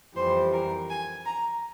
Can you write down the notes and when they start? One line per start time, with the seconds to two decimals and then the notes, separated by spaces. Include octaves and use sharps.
0.15 F2 E3 G3 C5
0.52 A#4
0.89 G#5
1.26 A#5